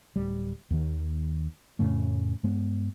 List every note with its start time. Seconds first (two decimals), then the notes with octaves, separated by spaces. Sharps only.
0.16 D1 G3
0.71 D#2 D#3
1.79 F2 A2 C#3 A3
2.43 G2 G#3 B3